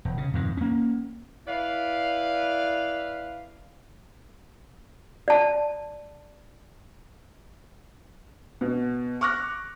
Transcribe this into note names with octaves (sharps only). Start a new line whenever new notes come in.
E1
C#3
F2 G#2 D#3
A#3 C#4
E4 B4 D5 F5
D5 A5
B2
C#6 D6 F6 F#6 A#6